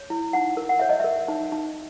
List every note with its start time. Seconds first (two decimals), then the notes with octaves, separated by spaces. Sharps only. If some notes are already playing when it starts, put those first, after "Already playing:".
Already playing: C#5
0.10 E4
0.33 D#4 F#5
0.57 A#4
0.69 F#5
0.80 C#5 E5
0.89 D#5
1.00 A#4 E5
1.28 D#4
1.52 D#4